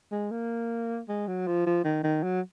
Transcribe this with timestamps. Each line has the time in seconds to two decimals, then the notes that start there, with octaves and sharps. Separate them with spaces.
0.12 G#3
0.31 A#3
1.09 G#3
1.27 F#3
1.47 F3
1.66 F3
1.85 D#3
2.04 D#3
2.23 F#3